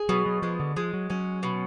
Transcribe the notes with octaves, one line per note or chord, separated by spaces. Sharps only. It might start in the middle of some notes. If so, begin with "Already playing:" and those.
Already playing: G#4
B2 F#3
F#3
F3 G#3
D3
F3 G#3
F#3
F#3 C#4
B2